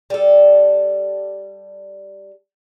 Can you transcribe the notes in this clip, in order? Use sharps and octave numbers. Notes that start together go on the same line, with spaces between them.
G3 A4